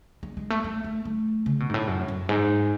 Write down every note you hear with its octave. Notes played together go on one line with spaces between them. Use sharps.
G#3
G#3
A3
A3
A3
A3
C#3
B2
G#2
A2
F#2
F#2
G#2